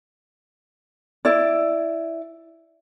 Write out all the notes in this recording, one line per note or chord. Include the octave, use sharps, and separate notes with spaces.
E4 D5